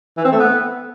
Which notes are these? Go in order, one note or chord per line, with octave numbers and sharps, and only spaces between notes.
E3
C4
A3
B3